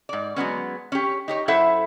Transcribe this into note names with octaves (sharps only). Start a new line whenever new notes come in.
G#2 D5
F#3 G#3 B3 C#4
C#4 G4
D#4 G4 C#5
F#2 E4 A4 C5 E5 F#5